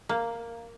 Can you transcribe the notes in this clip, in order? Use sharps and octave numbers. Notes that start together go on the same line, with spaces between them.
A#3